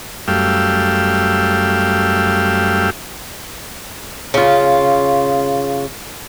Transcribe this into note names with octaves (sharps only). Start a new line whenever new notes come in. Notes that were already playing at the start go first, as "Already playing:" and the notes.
F#2 G3 A3 F5 G5 E6
C#3 F4